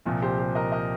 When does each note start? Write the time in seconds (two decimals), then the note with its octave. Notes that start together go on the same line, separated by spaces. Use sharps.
0.06 C2 A#2 F3
0.22 G4 C5
0.38 G4 C5
0.55 A#4 D#5
0.72 A#4 D#5